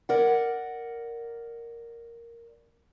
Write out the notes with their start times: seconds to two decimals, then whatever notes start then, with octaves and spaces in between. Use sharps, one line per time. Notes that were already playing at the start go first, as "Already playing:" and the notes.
0.09 A#4 D5 F#5